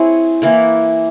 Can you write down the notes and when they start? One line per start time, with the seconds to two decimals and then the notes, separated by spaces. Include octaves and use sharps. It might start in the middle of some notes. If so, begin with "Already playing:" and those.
Already playing: C4 E4 G#4 C#5
0.42 E3 A#3 E4